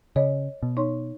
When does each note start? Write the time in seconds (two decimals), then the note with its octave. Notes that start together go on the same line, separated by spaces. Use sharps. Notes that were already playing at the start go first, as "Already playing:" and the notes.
0.16 C#3 C#5 D#5
0.63 B2
0.77 D#4 C#5 C6